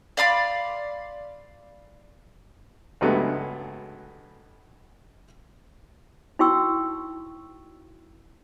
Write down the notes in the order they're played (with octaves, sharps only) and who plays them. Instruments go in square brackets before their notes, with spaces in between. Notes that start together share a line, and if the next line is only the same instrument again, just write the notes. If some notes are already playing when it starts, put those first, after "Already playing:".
[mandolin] D5 F5 B5 C6
[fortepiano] C#2 G2 F#3 G#3 A3 B3
[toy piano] D#4 E4 F#4 G5 C#6 E6